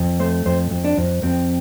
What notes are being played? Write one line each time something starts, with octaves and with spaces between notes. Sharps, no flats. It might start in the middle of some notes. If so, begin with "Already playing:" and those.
Already playing: F2
A3 C5
F2 C5
F2
D4
F2
F2 C4